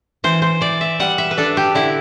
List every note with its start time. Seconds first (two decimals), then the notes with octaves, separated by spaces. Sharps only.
0.24 E3 C5
0.42 C5
0.61 E3 D5
0.81 E5
1.00 G3 F#5
1.18 E5
1.31 B4
1.37 D4 A4
1.57 G4
1.75 D3 E4